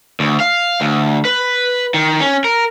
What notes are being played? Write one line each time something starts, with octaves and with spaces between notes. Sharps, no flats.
D2
F5
D2
B4
D#3
C#4
A#4